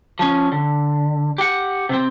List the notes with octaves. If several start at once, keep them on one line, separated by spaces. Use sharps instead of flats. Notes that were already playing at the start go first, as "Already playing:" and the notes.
F3 C#4
D3
G4 F#5
C3 C4